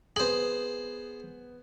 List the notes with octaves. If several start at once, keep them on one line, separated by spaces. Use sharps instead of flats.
B3 G#4 C5 F#7